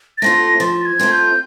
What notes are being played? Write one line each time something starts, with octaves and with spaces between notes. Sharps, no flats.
A6
A3 C4 F4 A#6
F3 A6
G#6
A3 C4 F4
G6